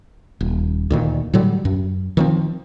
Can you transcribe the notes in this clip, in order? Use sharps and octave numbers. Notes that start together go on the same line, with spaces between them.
D#1
D2 A#2 D#3
A2 D3 F#3 G3
F#2
D#3 F3 C4